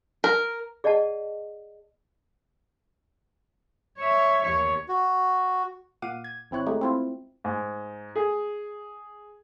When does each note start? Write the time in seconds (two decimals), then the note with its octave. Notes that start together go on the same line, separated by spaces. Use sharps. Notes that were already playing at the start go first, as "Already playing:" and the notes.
0.24 A#4
0.84 G#4 D5 D#5 F#5 A5
3.98 C#5 E5
4.44 D#2 C#5
4.88 F#4
6.02 A#2 F5 F#5 D6 D#7
6.24 G#6
6.51 G#1 C4 E4 C#5 F#6
6.66 G#3 A3 D#4 G4
6.81 C4 E4 F4
7.44 G#2
8.16 G#4